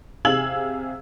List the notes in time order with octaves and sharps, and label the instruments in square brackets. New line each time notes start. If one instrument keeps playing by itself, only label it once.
[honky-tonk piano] C3 G#4 F5 E6 G#6 F#7